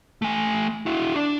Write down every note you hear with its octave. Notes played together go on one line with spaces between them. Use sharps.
A3 G#5
E4 F#4
D4 D5